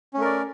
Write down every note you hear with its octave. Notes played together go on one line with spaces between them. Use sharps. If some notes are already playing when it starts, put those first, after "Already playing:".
A3 C#4 A#4 D5